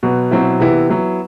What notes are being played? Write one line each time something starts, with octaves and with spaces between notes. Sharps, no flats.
B2 F#3 B3
B2 F#3 C4 E4
C3 E3 B3 E4
F#3 B3 E4